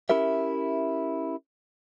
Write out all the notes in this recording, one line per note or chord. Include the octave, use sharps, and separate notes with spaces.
C#4 E4 G4 A#4 E5